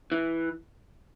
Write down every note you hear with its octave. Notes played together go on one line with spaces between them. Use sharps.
E3